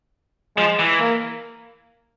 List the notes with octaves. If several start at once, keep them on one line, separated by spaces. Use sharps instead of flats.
F3 G#3
E3
A#3